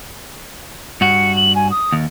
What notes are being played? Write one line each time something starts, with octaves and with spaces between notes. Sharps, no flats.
G2 F#4 C#7
F#7
G#5
D#6
D#2